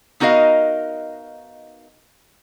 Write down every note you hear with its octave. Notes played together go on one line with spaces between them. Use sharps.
B3 D#4 F#4 A#4 D#5 F5